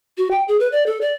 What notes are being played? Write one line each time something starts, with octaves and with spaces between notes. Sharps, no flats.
F#4
G5
G#4
B4
D5
A4
D5